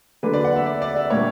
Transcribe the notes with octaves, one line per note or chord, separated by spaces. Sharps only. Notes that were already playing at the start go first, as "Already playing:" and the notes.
D3 F#3 A#3 D4 B4
D5
F#5
E5
D5
D5
E5
A#2 G3 A#3 D4 C#5